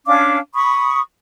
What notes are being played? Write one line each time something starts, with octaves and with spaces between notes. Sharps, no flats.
C#4 D4 F5 D6
B5 C#6 D#6